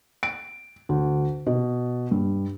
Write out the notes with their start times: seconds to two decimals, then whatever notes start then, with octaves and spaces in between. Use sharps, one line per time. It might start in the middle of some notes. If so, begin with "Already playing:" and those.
0.23 D7
0.89 D2
1.47 B2
2.11 G2